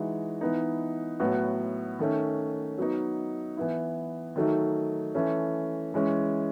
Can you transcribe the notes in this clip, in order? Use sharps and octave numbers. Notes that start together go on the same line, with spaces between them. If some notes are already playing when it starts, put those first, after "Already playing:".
Already playing: E3 G#3 D#4 F#4
E3 B3 D#4
A2 F#3 B3 F#4
D#3 A3 C#4
F#3 B3 D#4
E3 B3 E4
D#3 F#3 A3 D#4
E3 A3 C#4
E3 G#3 C#4